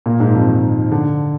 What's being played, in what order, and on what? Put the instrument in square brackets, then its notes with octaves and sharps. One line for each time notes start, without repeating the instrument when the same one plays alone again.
[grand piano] A#2 A#3
G#2 G#3
F2 F3
D#3
D3